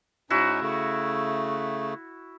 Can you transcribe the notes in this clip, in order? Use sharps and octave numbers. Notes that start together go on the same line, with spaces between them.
G#2 C#4 D#4 E4 F#4
C#3 A3